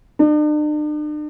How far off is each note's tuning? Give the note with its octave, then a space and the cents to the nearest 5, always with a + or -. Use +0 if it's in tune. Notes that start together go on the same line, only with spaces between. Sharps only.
D4 +45